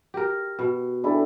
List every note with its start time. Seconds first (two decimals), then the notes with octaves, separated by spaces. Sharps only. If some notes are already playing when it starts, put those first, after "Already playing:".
0.14 G4 A#4
0.59 B2
1.04 D4 E4 A4